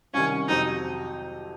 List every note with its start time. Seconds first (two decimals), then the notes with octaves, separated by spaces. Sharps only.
0.14 C2 C3 D#3 C#4
0.48 F2 C3 F#3 C4 D#4